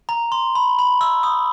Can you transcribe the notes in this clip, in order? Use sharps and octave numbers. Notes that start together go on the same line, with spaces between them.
A#5
C6
B5
B5
E6
D#6